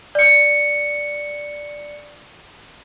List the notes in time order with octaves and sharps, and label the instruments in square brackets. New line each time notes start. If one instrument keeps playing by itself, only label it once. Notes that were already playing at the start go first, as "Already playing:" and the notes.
[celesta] D5 C#7